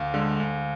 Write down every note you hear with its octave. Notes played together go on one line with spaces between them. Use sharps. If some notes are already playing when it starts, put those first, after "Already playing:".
Already playing: D2 F5
D3 G#3
D2